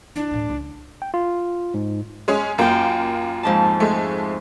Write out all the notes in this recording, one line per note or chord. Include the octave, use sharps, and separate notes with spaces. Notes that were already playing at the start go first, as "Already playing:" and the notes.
C#2 D4 E4
D2 A2
C#2
G5
F4
G#2
G#3 C#4 G#4
F#2 A#3 F4 G5
F2 G#2 A5
G#3 A3